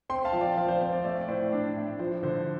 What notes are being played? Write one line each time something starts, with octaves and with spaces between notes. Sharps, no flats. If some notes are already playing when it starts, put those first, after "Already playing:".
C4 G5 C6
F5 A5
F3
D5 G5
F3 C5 F5
C5
C4 C5
D5
A3 D5
D5
A2 C5
D4
A2
F3 C5
D3 C5